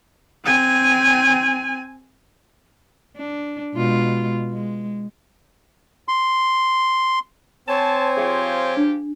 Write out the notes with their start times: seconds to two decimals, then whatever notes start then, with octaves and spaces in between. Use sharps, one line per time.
0.45 C4 G#5
3.17 D4
3.74 B2 G#3 F4
4.52 G#3
6.08 C6
7.68 C4 C5 C#5 G#5 A5
8.17 F3 F4 G4 G#4 F5
8.77 D4